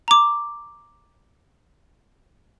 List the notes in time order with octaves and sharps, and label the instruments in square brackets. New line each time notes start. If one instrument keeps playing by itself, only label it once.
[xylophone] A#5 D6